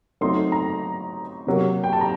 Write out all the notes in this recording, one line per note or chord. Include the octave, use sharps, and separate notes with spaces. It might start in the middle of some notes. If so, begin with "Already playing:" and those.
F#3 A3 C4 D#4 C6
A#5
C3 F#3 A#3
G5
A5
A#5